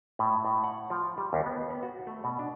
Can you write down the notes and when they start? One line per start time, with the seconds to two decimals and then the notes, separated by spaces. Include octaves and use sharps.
0.19 A2
0.45 A2
0.64 F#5
0.90 F3
1.18 G3
1.33 D#2
1.46 B3
1.70 B3
1.83 F#4
2.07 A3
2.24 B2
2.39 D4